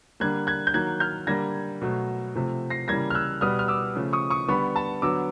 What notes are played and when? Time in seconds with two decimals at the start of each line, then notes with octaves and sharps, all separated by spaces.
0.20 D3 G3 A#3 F#6 G#6
0.47 F#6 G#6
0.67 G6
0.74 D#3 F#3 A#3 F#6 G#6
1.00 F6 G6
1.27 D3 G3 A#3 G#6 A#6
1.82 B2 F#3 A3
2.35 C3 F3 A3
2.70 A#6 C7
2.88 C#3 E3 G3 A#3 G#6 A#6
3.10 F6
3.15 E6 F#6
3.41 B2 G3 B3 D#6 F6
3.59 F6
3.68 D6 E6
3.95 C#3 F3 A3
4.13 C#6 D#6
4.30 C#6 D#6
4.48 D3 G3 B3 B5 C#6
4.76 A5 B5
5.02 D3 F#3 B3 D6 E6